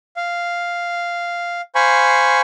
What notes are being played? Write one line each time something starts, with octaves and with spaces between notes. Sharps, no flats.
F5
C5 F5 G#5 B5 C#6